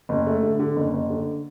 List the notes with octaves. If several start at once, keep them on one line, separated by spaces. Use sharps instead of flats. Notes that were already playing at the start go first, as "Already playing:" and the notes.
F#1
A3
D3
D3
F#1
F#1
D3